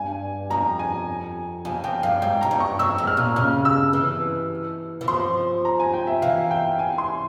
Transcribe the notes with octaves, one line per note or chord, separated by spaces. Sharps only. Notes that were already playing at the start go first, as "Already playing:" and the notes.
Already playing: G2 G#5
F2 A#5
G#5
F2 G#5
F2 G5
G2 F5
G#2 G5
G#2 A#5
G2
C#6
F2 E6
G#2
F6
A#2
C#3 F6
E6
E3
E3
F3 C6
A#5
G#5
G5
E5
E3 F5
G5
G#5
C6